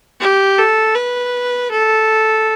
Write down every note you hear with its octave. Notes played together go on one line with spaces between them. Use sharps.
G4
A4
B4
A4